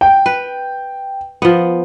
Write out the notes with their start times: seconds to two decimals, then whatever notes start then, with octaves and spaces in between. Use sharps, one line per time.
0.01 G5
0.26 B4
1.42 F3 B3